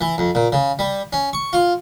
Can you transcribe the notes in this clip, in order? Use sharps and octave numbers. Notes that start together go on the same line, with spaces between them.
E3
F2
A#2
C#3
G3
C#4
C#6
F4